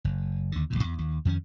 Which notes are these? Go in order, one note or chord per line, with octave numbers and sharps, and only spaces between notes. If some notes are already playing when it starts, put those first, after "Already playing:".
F#1
D#2 D3
A1 E2 A#2
E2
D#2
F2 D#3 B3 C#4